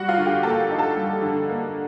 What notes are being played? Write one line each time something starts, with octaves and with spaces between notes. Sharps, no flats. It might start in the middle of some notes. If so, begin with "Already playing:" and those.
Already playing: G3 F#4 F#5
F4 F5
D3
G4 G5
A#3 A4 A5
D#4
A4 A5
G3
D3
A#3